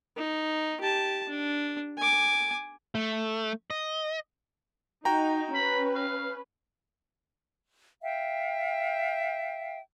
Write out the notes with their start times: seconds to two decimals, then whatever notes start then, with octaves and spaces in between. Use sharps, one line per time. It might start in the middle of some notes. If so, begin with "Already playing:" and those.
0.17 D#4
0.81 G4 A5
1.29 D4
1.98 G#5 D6
2.95 A3
3.70 D#5
5.05 D#4 F#4 G5 A#5
5.55 C#4 B4 B5
5.96 F5
8.02 E5 F5 G5